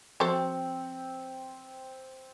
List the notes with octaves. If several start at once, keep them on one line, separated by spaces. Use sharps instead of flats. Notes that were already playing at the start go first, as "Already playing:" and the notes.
F3 C4 F#4 A4 C5 E5 G5